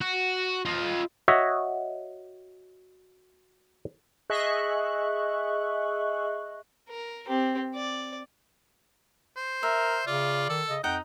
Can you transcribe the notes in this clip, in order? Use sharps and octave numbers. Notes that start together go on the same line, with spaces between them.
F#4
F4 D#5
F#4 C#5 D#5 E5
G#4 D#5 E5 C#6 F#6
A#4
C4 G4
D5
C5
A#4 E5
C#3 F4 D5
D#3 A4
C#3 D#5
F2 D#4 F#5 G5